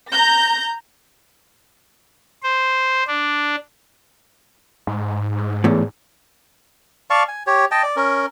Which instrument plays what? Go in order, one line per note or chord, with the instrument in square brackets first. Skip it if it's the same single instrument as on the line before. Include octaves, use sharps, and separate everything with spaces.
[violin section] A#5 G6 A#6
[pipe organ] C5
D4
[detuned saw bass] G#2
[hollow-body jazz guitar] E2 A2
[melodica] D5 F5 A5 C#6
G#5
G4 C#5
D#5 G5 A5
D5
C#4 A#4